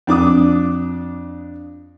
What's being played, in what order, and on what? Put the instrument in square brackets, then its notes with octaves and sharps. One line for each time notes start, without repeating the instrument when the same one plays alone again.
[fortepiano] F2 D4 D6 D#6